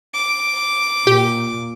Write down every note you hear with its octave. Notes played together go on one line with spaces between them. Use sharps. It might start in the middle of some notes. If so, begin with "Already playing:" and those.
D6
A#2 G4